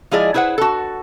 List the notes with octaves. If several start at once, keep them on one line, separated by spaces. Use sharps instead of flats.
F3 G#3 E4 G#4 D5 D#5
E4 G#4 B4 C5 F#5
F#4 A4